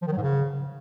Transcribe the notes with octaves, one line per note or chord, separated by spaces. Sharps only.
F3
D#3
F#3
G#2
C#3